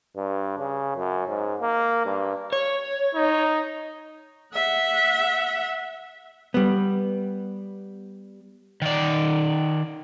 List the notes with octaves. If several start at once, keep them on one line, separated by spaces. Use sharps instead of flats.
G2
C#3
F#2
G#2
A#3
G2
C#5
D#4
E5 F#5
G3 B3
D#3 D5